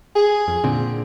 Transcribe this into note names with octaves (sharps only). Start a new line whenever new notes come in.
G#4
F2
A#2 D3 C4